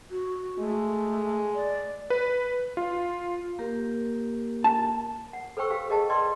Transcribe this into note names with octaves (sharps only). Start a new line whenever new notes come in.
F#4
G#3 A3
D5
B4
F4
A#3 G4 A#4
A5
F#5
A4 B4 C5 G5 C#6 E6
G4 F5 G5
G#4 A#4 D#5 G5 A5
B4 D5 D#5 G5 C6